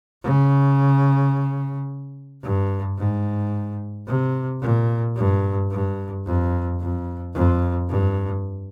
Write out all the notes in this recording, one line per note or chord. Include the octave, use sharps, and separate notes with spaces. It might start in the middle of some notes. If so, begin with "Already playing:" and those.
C#3
G2
G#2
C3
A#2
G2
G2
F2
F2
F2
G2